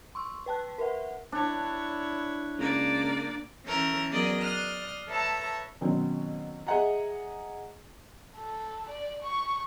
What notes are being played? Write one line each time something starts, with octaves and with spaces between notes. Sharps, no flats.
C6 C#6 E6
B4 G5 A5 F#6
A#4 B4 E5 F#5
D4 E4 C#5
C#2 A#3 D5
E3 C#4 A4 A#4 G6
F#3 B3 G#4 A#4 D5 D#5
D5 C6 D#6 F6 F#6
A4 B4 C#5 E5 A5 A#5
B2 D#3 F#3 C4 C#4
G#4 D#5 E5 F#5 G#5 A#5
A4
D5
C#6